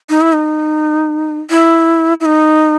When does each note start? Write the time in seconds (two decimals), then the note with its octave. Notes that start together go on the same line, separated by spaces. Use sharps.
0.09 D#4
0.21 E4
0.33 D#4
1.50 E4
2.21 E4
2.25 D#4